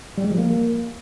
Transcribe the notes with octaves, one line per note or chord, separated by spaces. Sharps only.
G3
G#3
F3
A#3